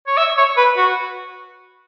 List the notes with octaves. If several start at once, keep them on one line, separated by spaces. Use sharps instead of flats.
C#5
E5
C#5
B4
F#4